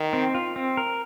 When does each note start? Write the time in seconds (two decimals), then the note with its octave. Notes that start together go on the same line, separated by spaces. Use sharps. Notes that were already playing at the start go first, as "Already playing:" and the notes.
Already playing: D#3
0.13 C4
0.34 F4
0.56 C4
0.77 A#4